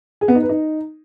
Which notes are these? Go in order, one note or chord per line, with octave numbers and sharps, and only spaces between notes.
G#4
B3
D#4
B4
D#4